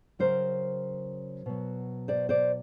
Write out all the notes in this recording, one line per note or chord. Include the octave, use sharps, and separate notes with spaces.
C#3 F#3 A#4 C5
B2 F#3
C5 D5
C5 D5